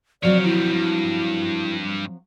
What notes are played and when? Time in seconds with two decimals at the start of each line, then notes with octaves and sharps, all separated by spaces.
0.23 F3 F#3 C4 C#5 D5 F5
0.44 D#3 G3 E4
0.72 G2